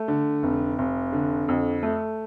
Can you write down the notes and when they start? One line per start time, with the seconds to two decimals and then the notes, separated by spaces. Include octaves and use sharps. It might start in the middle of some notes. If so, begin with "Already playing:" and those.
Already playing: A3
0.08 D3
0.43 F1
0.78 F1
1.13 D3
1.48 F2
1.83 A3